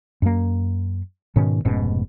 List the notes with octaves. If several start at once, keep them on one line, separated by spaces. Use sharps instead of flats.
F#2 A#3
G#2 B2 D#3 C#4
F1 G#2 B2 C#4